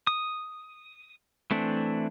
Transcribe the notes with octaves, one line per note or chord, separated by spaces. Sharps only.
D#6
E3 A3 C4 D4